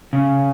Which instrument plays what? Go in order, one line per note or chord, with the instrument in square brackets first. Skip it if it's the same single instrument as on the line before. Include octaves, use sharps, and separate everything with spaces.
[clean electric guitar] C#3